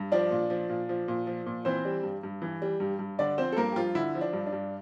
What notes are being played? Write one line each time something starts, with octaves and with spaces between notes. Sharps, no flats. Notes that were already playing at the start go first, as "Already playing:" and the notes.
Already playing: G2
F3 D4 D5
A#2
F3
A#2
F3
A#2
F3
A#2
E3 C4 C5
G3
G2
G2
E3
G3
G2
G2
D3 D4 D5
F3 C4 C5
A4
G2 A#3 A#4
G4
G2 F3 F4
D3 E4
F3
D4
G2
D4
G2